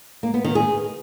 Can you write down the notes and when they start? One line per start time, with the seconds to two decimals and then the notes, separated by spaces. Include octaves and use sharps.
0.23 A#3
0.34 B3
0.44 D#3
0.55 G#4